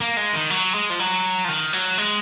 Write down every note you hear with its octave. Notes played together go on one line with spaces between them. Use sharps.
A#3
G#3
D#3
F#3
G#3
F3
F#3
F3
D#3
F#3
G#3